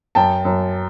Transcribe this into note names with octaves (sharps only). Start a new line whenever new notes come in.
F#2 G5 A5
F#2